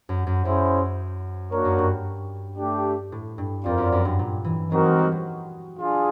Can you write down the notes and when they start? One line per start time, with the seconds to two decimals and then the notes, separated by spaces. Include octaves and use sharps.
0.09 F#2
0.27 F#2
0.45 F#2 C#4 E4 G#4 C5
1.51 A#3 D4 F#4 A#4 C#5
1.65 F#2
1.78 G2
2.58 A3 D4 G4
3.12 A2
3.38 G2
3.65 F2 C4 F4 A#4 D5
3.78 F#2
3.92 F#2
4.05 G2
4.19 A#2
4.45 E3
4.72 F#3 C4 D#4 F#4 A#4
4.85 G#3
4.99 G3
5.12 F#3
5.79 D4 F4 G#4